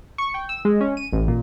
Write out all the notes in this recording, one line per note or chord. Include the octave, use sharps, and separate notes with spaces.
C#6
G5
E6
G#3
C#4
D#7
A1
A#2